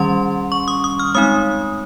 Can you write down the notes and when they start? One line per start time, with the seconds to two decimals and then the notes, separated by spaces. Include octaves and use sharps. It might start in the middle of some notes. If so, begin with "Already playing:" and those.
Already playing: D#3 G3 C#4 C6
0.52 C#6
0.68 D#6
0.84 D#6
0.99 F6
1.15 G#3 C4 D#4 D#6